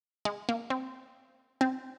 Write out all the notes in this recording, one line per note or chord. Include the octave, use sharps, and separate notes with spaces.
G#3
A#3
C4
C4